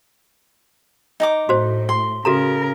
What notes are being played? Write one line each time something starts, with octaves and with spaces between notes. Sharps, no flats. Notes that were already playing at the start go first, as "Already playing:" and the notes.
D#4 A#5 D6
A2 F#4 C5
C6
C#3 F#4 A4 A#4 A#5